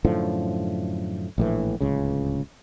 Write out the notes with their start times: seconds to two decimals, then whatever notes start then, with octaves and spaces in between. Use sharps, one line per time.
0.05 F#2 A2 D3 F3
1.38 A#1 A2 E3
1.81 D1 C#2 C#3